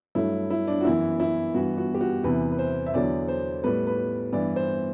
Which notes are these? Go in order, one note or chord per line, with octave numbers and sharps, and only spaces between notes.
G2 F#3 A3 E4
E4
D4
F#4
F#2 E3 B3 E4
E4
G2 E3 B3 F#4
F#4
G4
F#4
E2 C3 E3 B4
B4
C5
E5
E2 D3 F#3 D5
C5
A2 G3 B3 B4
B4
G2 E3 B3 D5
C5